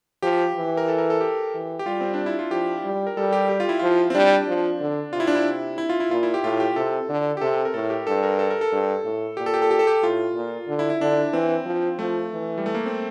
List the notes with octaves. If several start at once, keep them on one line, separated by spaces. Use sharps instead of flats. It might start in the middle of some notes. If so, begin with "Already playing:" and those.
F3 G4
E3
A#4
A4
A#4
A4
G4
E3
G4
G3 F4
C4
D4
E4
F4
F3 G4
G3
A#4
G3 A4
G4
G4
F4
E4
F3 F4
C4
G3 D4
F3
D3
C3 F4
E4
D4
E4
E4
F4
E4
A#2 F4
E4
G4
A2 F4
G4
C3 A4
D3
G4
C3 A4
A#4
A2 A4
G4
G2 A4
A#4
A4
A#4
A4
G2
A2
A#2 G4
A4
G4
A4
G4
A4
G4
A2 F4
A#2
D3
E4
E4
D3 D4
E3 C4
F3
F3 A3
E3
G3
A3
A#3
C4